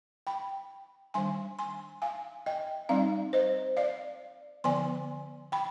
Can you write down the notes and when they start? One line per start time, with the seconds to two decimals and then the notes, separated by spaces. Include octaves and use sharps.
0.27 G5 B5
1.14 D#3 G3 D4 G#5 C6
1.59 G#5 C6
2.02 F5 G#5
2.46 D#5 G5
2.89 G3 C4 D#4 D5 F5
3.33 C5 D#5
3.77 D5 F5
4.64 D3 F3 B3 G#5 C6
5.52 G5 B5